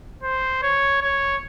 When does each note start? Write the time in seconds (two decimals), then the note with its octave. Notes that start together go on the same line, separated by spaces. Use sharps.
0.23 C5
0.63 C#5
1.01 C#5